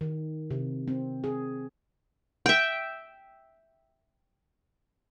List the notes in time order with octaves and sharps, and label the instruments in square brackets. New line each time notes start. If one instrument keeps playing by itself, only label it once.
[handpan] D#3
C3
C4
G#4
[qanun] E5 G5